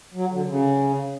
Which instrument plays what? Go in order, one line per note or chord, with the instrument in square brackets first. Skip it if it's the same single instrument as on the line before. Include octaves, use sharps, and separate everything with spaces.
[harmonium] F#3
D3
C#3